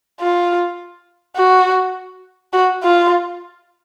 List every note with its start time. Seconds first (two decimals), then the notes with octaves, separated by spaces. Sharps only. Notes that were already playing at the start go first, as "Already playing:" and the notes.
0.21 F4
1.36 F#4
2.53 F#4
2.83 F4